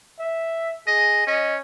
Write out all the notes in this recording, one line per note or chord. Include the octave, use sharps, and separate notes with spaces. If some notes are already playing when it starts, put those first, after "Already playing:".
E5
G#4 D#5
C#4 D#5